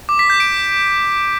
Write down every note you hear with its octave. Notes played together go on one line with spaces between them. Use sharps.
D6
B6
G6
D7